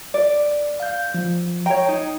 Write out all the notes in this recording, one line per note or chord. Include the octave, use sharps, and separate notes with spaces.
D5
F5 G6
F3
C#5 G5 A#5
D#4